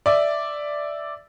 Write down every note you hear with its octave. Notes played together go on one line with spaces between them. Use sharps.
D5 E5